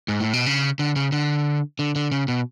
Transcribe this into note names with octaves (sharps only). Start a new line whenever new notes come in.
G#2
A2
B2
C#3
D3
C#3
D3
D3
D3
C#3
B2